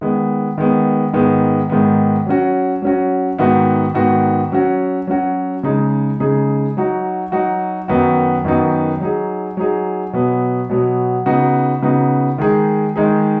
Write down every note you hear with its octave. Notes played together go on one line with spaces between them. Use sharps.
D#3 G#3 B3
D#3 G#3 B3
G#2 D#3 G#3 B3
G#2 D#3 G#3 B3
F#3 C#4 F#4
F#3 C#4 F#4
G#2 D#3 B3 F#4
G#2 D#3 B3 F#4
F#3 C#4 F#4
F#3 C#4 F#4
C#3 G#3 D#4 G#4
C#3 G#3 D#4 G#4
F#3 D#4 F#4
F#3 D#4 F#4
F#2 D#3 B3 D#4 F#4
F#2 D#3 B3 D#4 F#4
F#3 D#4 G#4
F#3 D#4 G#4
B2 F#3 B3
B2 F#3 B3
C#3 B3 D#4 F#4
C#3 B3 D#4 F#4
D#3 G#3 D#4 G#4
D#3 G#3 D#4 G#4